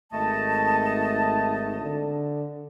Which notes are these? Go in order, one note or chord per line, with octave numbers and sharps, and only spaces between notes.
G#1 A3 D#5 A5
D3